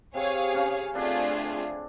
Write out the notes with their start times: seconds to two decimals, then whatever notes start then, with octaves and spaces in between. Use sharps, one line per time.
0.14 C3 C4 G#4 C#5 F5
0.54 C#3 C#4
0.94 D3 A3 C4 D4 F4 G#4